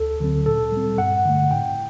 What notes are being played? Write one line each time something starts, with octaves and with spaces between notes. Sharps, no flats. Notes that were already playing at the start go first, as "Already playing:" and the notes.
Already playing: D2 A4
D3 F#3 C4
A#2 A4
G3 C4
G2 F#5
D3 A3
A2 G5